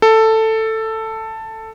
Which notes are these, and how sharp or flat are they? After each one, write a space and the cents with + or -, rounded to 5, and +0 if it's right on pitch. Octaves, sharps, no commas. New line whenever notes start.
A4 +10